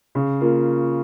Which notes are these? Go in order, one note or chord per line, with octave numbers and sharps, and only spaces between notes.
C#3
A#3 F4